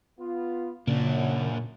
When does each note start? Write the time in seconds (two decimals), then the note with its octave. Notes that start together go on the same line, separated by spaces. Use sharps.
0.20 B3 F4
0.87 F#2 A#2 C#3 A#3 D4